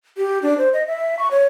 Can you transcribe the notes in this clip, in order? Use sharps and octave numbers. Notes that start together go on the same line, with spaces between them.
G4
D4
C5
D#5
E5
C#6
C#5